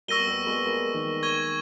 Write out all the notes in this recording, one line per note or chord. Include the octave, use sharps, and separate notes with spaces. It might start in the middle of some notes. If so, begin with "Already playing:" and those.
G3 A#3 C#6 E6 A#6 D#7 G7
B3
G3 A#3
G#3 B3
G3 A#3
D#3 G3
C#6 G#6 D#7 G7